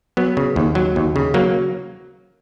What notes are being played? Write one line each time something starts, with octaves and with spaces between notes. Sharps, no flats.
F#3 B3
C#3
D#2
F#3
D#2
C#3
F#3 A#3